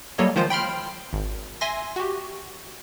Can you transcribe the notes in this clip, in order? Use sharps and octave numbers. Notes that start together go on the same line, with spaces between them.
F#3 G3 A#3 A4 C#5 D#5
D#3 F3 G#3 F4 C5
G5 B5 C6 F6
G#1
E5 G#5 C6 A#6
F#4 G4